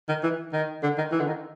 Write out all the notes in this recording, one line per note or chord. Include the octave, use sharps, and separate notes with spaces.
D#3
E3
D#3
D3
D#3
E3
D3
D#3